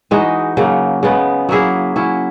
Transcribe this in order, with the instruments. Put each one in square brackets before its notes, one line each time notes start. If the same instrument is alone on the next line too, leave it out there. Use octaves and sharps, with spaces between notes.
[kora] E3 G#3 D#4 F#4
C#3 F#3 A#3
C#3 G#3 B3
F#3 A#3 E4 G#4
F#3 C#4 E4